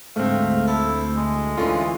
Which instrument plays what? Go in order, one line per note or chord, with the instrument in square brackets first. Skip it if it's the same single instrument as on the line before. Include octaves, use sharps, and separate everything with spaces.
[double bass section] D2 [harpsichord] G#2 [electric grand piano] A3 C4 [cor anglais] F5
[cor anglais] E4 [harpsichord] A4
[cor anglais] G#3
[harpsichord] D3 C#4 [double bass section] E3 [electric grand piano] F4